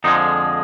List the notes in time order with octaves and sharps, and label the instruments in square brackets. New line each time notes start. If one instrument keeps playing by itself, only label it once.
[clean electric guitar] F2 D3 F3 G#3 D#4